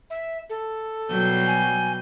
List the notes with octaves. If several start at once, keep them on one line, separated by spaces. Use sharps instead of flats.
E5
A4
B2 F#3 G3 G6
G#5